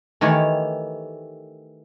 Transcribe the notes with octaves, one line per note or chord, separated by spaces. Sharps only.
D#3 E3 A3 G4 C#5